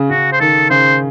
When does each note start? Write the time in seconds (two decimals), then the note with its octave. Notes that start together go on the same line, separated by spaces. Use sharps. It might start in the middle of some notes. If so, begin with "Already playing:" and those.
Already playing: C#3
0.10 C#3 F#4
0.32 C5
0.40 D#3 A4
0.70 C#3 C5